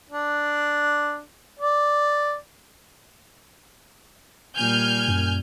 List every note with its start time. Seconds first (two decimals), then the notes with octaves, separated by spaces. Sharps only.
0.10 D4
1.59 D5
4.56 A#2 G3 G#5 F6 G6
5.08 F#2